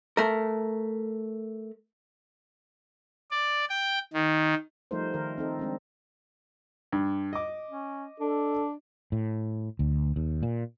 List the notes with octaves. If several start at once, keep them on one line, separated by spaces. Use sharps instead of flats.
A3 A#4
D5
G5
D#3
F3 G3 A3 D#4 A#4 C5
D#3 A#4
C4 D#4 A4
G#3 C4 D4
G2
D#5 D6
C#4
D4 A4
A2
D2
D#2
A#2